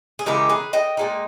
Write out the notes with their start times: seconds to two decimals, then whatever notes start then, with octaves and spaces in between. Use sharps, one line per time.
0.19 G#4
0.26 C#3 E3 G#3 D#4 G4 A#4
0.49 G#4 B4
0.73 D#5 G5
0.97 A#2 G#3 D#4